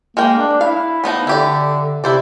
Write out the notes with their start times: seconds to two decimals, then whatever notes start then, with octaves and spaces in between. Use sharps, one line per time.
0.17 G#3 A#3 A#4 G5
0.38 D4
0.61 E4 F5
1.04 F3 B3 D#4
1.27 D3 E4 G4 D5
2.04 C3 E4 C5 D5